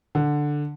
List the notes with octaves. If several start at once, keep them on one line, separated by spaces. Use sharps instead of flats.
D3